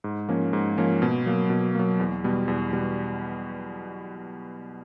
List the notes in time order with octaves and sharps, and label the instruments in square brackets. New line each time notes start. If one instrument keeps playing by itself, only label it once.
[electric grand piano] G#2
F3 A#3 C#4
G#2
F3 A#3 C#4
B2
F#3 A#3
B2
F#3 A#3
E2
B2 G3
E2
B2 G3